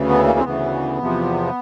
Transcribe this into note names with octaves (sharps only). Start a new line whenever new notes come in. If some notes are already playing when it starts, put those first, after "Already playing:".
Already playing: D2 C#3 E3
B3
A#3
C4
D2 C#3 E3 B3
E2 C3 F3